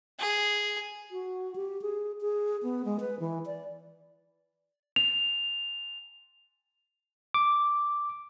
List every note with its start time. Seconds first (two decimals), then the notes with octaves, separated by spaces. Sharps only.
0.19 G#4
1.11 F#4
1.56 G4
1.82 G#4
2.21 G#4
2.63 B3
2.85 G#3
3.00 B4
3.20 E3
3.46 D5
4.96 F7
7.34 D6